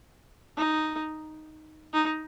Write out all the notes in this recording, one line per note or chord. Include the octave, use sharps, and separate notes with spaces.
D#4
D#4